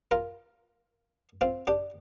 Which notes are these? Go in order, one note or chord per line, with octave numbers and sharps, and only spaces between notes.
F4 A#4
C4 F4
D4 G4